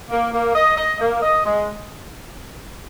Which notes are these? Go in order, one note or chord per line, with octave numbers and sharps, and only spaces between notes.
A#3
A#3
D#5
D#5
A#3
D#5
G#3